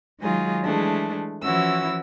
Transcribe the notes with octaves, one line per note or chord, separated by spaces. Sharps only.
D#3 F#3 G#3 D#4 F4 G#4
E3 G#3 A3 D4
E3 F3 C#4 E4 F#4 E6